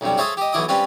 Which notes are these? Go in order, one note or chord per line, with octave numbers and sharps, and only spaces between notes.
B1 F#2 C3 G3
G#4 A4 C5 C#5 E5 F5
G4 D#5
B1 E3 F#3 E4 D6 D#6
G3 C4 C#4 F4 B4